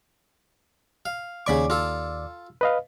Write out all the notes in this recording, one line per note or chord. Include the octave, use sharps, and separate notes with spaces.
F5
D#2 C#3 D5 B5 C#6 D6
F4 A4
B4 D#5 F5